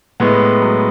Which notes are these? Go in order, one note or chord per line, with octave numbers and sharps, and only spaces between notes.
A2 G#3 B3
F#3